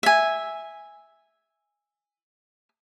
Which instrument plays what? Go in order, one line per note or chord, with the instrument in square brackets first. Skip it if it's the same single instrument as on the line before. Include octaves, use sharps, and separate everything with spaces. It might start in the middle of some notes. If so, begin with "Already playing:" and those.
[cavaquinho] E5 G#5